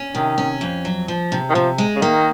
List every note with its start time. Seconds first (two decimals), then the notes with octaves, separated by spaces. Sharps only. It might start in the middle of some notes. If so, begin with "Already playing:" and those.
Already playing: C#4
0.15 C3 D#3
0.38 C#4
0.61 F2
0.85 F#3
1.08 F3
1.32 C3
1.50 D#3
1.55 C3 F3
1.78 G#3
1.96 C#3
2.01 D#3 A#3